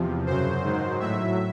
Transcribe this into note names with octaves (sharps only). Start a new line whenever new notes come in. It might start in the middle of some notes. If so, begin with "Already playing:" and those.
Already playing: E2 C3 F3
F#2 C#3 F#3 C5
G#2 D#3 F#3
A2 F#3 E5